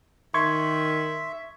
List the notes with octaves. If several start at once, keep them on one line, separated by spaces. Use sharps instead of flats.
D#3 E5 C6 C#6 G#6